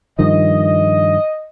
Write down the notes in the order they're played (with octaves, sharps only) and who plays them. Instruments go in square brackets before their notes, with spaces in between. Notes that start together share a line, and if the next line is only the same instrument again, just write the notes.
[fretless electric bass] G2 D#3 F3 [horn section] D#5